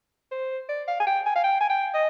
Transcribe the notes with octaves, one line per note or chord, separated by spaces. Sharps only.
C5
D5
F5
G#5
G5
G#5
F5
G5
G#5
G5
D#5